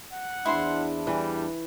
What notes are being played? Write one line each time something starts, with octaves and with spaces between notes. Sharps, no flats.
F#5
E2 D4 E4 C5 C6
E3 G3